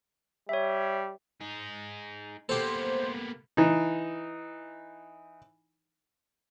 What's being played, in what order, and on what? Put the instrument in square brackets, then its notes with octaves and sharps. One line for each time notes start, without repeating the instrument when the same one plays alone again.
[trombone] G3 [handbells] C#5 E5
[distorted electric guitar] D#4 G#4
[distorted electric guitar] A#3 B3 [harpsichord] G4 A4 [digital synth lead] C5
[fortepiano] E3 D#4